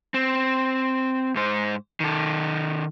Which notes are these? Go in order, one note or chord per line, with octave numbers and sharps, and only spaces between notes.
C4
G#2 C5
D#3 A4